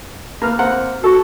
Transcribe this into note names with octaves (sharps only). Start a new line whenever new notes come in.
A#3 B4 F6
A#3 C4 F#5
F#4 A4